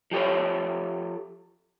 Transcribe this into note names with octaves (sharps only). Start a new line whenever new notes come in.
F3 G4 A4 C#5